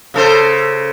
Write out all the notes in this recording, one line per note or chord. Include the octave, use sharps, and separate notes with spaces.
C#3 A4 C5